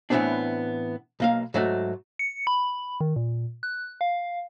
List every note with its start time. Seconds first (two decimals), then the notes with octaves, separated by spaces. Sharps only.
0.10 A2 E3 G#3 B3 C4 D4
1.20 B1 A#3 F5
1.54 G#2 F#3 A3 F#4
2.19 C#7
2.47 B5
3.01 D#3
3.16 A#2
3.63 F#6
4.01 F5